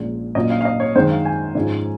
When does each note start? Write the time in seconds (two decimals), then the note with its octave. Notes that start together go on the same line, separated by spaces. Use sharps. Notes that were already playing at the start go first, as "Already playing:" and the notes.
Already playing: A#1 A#2 G#3 C#4 F4
0.35 A#2 F#3 A#3 C#4 F4 D#5
0.50 F5
0.61 F5
0.65 D#5
0.80 C#5
0.95 F#2 D#3 G#3 C4 C5
1.11 F5
1.25 G#5
1.55 G#2 F3 G#3 C#4 F4